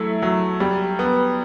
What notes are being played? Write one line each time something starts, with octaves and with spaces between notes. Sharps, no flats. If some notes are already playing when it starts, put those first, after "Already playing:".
Already playing: F#3 A3 E4
F#3
G3
B3